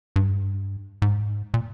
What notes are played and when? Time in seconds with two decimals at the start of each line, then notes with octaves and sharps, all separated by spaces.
0.16 G2
1.02 G#2
1.54 A#2